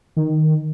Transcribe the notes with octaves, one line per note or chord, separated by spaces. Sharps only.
D#3